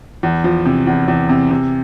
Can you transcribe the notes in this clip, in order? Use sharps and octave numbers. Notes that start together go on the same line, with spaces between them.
E2
F3
C3
E2
E2
C3
C3